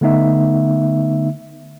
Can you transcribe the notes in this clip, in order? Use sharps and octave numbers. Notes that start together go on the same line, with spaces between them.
D3 A3 B3 D#4 E5